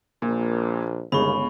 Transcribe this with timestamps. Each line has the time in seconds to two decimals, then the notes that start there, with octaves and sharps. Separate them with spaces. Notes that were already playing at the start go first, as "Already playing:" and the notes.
0.22 A#1 A#2
1.12 G1 D#2 C#3 G#3 B5 C#6